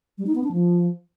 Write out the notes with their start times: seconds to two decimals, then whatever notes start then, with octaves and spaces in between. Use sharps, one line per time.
0.18 G3
0.27 D#4
0.35 B3
0.44 D4
0.52 F3